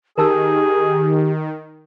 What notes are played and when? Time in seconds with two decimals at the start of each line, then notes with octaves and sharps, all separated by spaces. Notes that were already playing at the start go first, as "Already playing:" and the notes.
0.18 D#3 G4 G#4 A#4 A5 E6